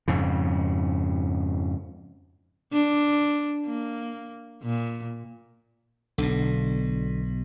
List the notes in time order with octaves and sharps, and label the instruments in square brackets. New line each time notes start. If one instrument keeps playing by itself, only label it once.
[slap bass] F2 G#2 C#3
[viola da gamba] D4
A#3
A#2
[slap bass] B1 B2 [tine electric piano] D3